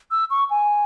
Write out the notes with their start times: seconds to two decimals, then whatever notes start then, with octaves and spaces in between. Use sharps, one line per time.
0.11 E6
0.30 C#6
0.50 G#5